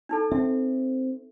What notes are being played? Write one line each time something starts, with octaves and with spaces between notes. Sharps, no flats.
D4 D#4 A4
C4 E5